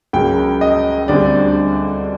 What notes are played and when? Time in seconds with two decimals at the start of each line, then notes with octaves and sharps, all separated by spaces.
0.13 C#2 C#3 F#3 A#3 G5
0.61 D#5
1.08 D2 D3 G3 C4 D5